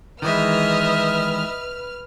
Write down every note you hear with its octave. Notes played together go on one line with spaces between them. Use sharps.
D#3 E3 G#3 B4 D#5 E5 F6